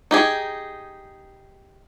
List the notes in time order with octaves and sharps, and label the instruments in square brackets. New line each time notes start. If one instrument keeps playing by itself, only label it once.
[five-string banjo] D#4 G4 G#4